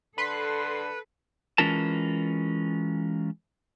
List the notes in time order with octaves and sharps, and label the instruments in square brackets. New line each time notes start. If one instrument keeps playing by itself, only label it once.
[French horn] D3 [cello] A4 [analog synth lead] B4 [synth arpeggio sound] B5 C6 C7
[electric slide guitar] E3 G#3 C#4 F4 A#4 A5